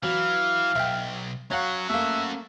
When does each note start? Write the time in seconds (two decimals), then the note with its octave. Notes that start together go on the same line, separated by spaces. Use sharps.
0.03 E3 F#3 F5
0.75 B1 E5 G5
1.51 F#3 C#4 C#5 F5 F#5
1.90 A3 A#3 E5